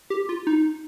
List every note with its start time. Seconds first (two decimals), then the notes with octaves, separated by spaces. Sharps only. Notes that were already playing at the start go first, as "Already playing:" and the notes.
0.10 G4
0.29 F4
0.47 D#4